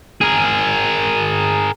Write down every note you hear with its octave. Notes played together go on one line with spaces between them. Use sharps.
G#4 A#4